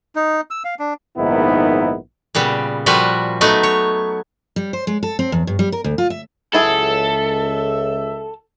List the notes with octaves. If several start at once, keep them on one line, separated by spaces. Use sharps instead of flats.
D#4
E6
F5
D4
A#1 G#2 D#3 B3 D#4 E4
A#2 C#3 G3 B3
A#2 F3 G3 F#4 B4
F#3 A3 B3 D#4
C#5
G3
C5
G#3
A4
C4
E2
G2
G3
A#4
D2
F4
E5
C#2 F#3 E4 G#4 A4 E5